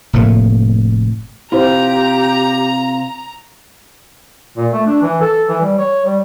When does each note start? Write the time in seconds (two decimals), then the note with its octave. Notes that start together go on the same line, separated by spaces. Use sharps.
0.13 F1 A2 A3 A#3
1.52 C3 E4 F4 G4 C5 A#5
4.57 A#2
4.73 A3
4.86 D4
5.02 E3
5.21 A4
5.48 E3
5.61 G3
5.78 C#5
6.05 G3